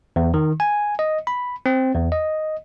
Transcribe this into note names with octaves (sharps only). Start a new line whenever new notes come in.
E2
D#3
G#5
D#5
B5
C4
E2
D#5